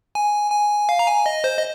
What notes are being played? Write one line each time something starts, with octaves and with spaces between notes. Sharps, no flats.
G#5
G#5
F5
A#5
G#5
D#5
C5
D#5